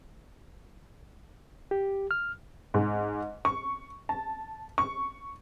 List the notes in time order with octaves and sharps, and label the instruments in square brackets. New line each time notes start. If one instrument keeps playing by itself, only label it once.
[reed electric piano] G4
F6
[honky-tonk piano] G#2
C#6
A5
C#6